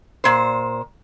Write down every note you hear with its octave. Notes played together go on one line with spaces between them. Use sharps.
A#2 C5